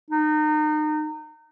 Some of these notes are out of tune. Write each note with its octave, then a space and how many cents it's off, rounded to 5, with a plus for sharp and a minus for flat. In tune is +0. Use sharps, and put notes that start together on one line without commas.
D#4 -30